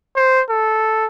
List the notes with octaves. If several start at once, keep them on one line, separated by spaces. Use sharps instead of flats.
C5
A4